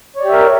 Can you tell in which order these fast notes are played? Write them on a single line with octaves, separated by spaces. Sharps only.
C#5 D5 G4 E5 A#4